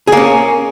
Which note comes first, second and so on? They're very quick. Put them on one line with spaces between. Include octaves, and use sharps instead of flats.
G#4 A#3 C#4